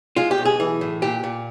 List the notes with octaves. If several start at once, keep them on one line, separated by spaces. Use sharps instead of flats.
G#3 F4
G4
B1
G#4
E3
A2
A#2 G4
A#2